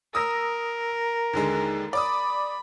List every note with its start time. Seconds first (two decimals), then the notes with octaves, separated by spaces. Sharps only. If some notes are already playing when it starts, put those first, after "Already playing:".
0.15 A#4 D#6 E6 A#6
1.33 D#2 D3 G#3
1.93 D5 B5 D6 D#6